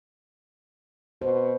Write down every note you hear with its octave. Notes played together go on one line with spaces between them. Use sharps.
B2 C5